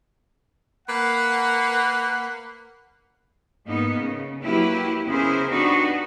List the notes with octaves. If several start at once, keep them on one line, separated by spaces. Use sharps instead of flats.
A#3 B4 F#5
G#2 A#3 B3 D#4
C#3
F#3 A#3 E4 G4 B4
C#3 B3 E4 G#4 A#4 C5
B3 D4 D#4 F#4 G4 B4